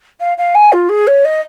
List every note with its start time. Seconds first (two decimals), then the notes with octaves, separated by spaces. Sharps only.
0.20 F5
0.37 F5
0.54 G#5
0.72 F4
0.89 G#4
1.07 C#5
1.24 D#5